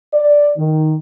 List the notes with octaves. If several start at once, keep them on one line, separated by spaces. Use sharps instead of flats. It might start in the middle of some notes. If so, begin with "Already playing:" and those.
D5
D#3